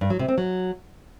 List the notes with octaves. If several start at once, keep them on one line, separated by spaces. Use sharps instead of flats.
G2
F#3
C3
C4
F#3